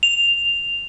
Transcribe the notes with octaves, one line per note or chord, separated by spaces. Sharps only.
F7